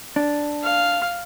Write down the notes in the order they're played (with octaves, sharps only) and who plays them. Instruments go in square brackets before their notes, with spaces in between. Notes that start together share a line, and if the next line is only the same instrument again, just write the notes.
[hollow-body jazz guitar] D4
[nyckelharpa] F5